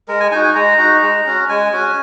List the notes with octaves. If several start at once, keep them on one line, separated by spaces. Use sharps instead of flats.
G#3 A#4
G#5
D#4 F#4 G#5
G#5
G#3 A#5
D#4 F#4
G#3
C#4 F#4
G#3 G#5
C#4 F#4